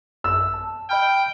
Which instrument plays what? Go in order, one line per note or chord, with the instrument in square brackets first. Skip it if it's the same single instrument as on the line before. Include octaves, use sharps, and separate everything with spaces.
[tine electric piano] A1 F#2 [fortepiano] E6
[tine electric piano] A5
[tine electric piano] D#5 B5 F6 [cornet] G5